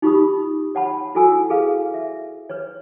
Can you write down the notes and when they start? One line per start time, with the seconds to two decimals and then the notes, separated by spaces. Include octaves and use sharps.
0.02 D#4 F4 G4 B5 D#6
0.75 C#5 F#5 A5 B5
1.15 E4 F#4 A4 G#5 E6
1.50 E4 G#4 A4 B4 F5
1.94 E5
2.50 B4 C#5